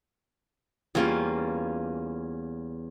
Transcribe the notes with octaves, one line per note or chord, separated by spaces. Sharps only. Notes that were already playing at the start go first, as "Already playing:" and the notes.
E2 G3 A#3 C#4 F4 F5